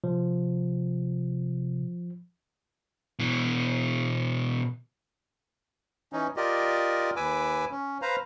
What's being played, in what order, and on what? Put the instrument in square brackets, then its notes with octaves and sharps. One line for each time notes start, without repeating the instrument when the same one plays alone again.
[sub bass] C3 [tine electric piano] F3
[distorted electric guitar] B2 E3
[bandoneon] E3 C#4 D#4
F4 G4 A#4 D5 D#5
D#2 B4 G#5 D6 E6
C#4
B4 C5 F5 A#5